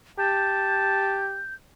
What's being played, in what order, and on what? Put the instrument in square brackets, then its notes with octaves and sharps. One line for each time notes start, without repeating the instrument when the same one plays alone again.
[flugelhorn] G4 [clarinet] A5 [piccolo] G6